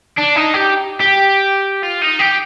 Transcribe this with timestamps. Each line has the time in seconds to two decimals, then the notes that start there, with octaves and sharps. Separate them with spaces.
0.18 D4
0.36 D#4
0.54 G4
1.00 G4
1.83 F4
2.02 D#4
2.20 G4